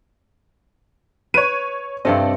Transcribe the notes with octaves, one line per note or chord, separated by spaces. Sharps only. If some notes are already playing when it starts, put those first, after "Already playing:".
B4 C#5 D#7
G2 C3 C4 A4 D5 D#5